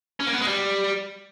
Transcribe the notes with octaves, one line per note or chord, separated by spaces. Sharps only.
C#4
A#3
B3
G#3
G3